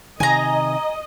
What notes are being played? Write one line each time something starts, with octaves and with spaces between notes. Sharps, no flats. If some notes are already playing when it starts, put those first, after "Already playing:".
C3 D#3 D#5 G#5 A#5